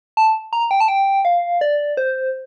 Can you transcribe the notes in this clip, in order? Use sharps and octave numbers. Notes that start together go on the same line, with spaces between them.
A5
A#5
G5
A5
G5
F5
D5
C5